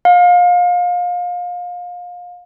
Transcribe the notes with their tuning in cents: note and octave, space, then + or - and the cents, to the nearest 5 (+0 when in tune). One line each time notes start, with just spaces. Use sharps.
F5 +30